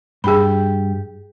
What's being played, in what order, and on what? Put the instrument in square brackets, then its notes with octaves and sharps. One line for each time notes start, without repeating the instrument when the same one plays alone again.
[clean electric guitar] G2 G4 [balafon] G#4 B5